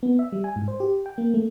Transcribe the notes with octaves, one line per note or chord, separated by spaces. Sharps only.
B3
E5
G3
G#5
G#2
C5
G4
G5
A#3
A3